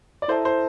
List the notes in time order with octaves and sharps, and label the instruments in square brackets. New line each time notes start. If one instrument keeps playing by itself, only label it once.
[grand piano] D5
[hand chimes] E4 A4 E5 A5 [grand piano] C5
[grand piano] C5